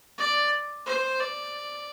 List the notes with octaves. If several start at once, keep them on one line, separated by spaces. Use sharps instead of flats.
D5
C5
D5